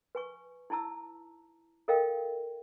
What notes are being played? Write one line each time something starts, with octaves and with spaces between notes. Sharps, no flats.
B4 G#5 C#6
D#4 E4 A5 A#5 E6
A4 A#4 D#5 F5 G5